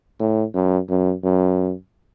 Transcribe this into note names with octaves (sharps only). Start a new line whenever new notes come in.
A2
F#2
F#2
F#2